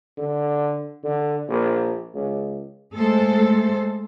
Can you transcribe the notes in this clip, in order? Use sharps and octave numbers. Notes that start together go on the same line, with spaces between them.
D3
D3
A#1
C#2
G#3 A3 A4 C5